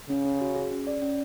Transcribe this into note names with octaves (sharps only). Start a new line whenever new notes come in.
C#3 C#4
C#4
F#4
G#4
C#4
D5
C#4